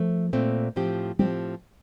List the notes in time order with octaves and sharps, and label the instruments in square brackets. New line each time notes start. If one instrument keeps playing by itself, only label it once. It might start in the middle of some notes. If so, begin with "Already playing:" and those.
Already playing: [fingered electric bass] F3 [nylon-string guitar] A3
[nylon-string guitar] A#2 A3 C4
A2 F3 C4 G4
[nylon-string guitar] A2 F3 C4 G4 [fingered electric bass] G3